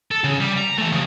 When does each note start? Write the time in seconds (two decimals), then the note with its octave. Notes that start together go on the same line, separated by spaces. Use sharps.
0.11 A4
0.24 C#3
0.40 G3
0.58 A#5
0.78 E3 A3
0.92 F2 C#3